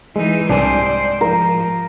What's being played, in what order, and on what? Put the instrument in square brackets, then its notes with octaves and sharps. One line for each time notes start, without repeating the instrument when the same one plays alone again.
[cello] E3 D#4 [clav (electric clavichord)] G#3
[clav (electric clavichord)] C2 D4 [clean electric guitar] G#2 G4 G#5 [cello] C5 D5
[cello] F3 [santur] A#4